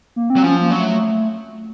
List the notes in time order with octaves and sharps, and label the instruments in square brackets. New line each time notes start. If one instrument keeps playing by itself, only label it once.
[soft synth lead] A#3
C4
[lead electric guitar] F#3
[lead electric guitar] F3 [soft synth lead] C#4
[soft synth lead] A#3
[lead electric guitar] F#3
[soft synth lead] A3